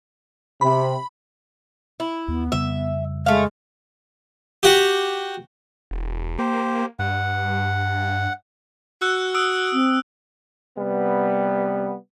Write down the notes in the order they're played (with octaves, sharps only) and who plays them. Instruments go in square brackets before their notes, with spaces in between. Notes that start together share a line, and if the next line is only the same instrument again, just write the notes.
[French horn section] C3 [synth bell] B5
[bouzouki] E4
[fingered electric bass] D#2 [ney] B3
[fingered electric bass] F2 C#3 G3 [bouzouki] E5
[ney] G#3 [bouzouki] A3 F5
[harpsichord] F#4 G4
[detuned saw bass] E1
[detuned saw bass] A#3 [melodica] G4 C5
[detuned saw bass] G2 [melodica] F#5
[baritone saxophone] F#4 [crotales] E6 F#6
[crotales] D#6 E6 D7
[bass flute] C4
[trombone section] C3 G3 B3